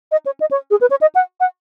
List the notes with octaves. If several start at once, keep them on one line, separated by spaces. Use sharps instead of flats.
D#5
C#5
D#5
C#5
G#4
B4
C#5
D#5
F#5
F#5